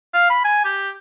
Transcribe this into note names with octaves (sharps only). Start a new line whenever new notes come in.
F5
B5
G#5
G4